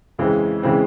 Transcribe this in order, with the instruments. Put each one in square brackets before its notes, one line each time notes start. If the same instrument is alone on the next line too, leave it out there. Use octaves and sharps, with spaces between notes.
[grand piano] F2 C#3 E3 G#3 C4
C#3 E3 G#3 C4